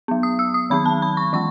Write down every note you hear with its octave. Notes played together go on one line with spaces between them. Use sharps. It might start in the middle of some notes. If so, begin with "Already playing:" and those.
F#3 B3
D#6
E6
D#6
D#3 F#3 B3 B5
A5
B5
C#6
E3 G#3 C#6